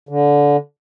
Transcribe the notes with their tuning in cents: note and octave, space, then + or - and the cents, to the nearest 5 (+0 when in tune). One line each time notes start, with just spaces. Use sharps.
D3 -20